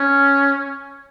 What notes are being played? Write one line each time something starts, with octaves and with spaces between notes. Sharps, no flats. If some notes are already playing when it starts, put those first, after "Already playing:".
Already playing: C#4